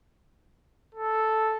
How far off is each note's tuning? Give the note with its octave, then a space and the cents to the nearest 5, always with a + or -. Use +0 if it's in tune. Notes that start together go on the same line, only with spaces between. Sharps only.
A4 -5